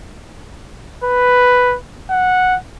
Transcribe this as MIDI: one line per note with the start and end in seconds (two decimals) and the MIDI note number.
1.04 1.76 71
2.10 2.56 78